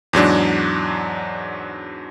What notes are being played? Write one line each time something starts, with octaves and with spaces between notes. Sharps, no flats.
E2 G#2 F#3 D4